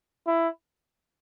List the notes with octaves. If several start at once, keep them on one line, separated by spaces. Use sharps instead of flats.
E4